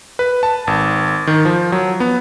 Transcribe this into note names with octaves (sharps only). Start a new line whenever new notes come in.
B4
A5
G#1
D#3
F3
F#3
B3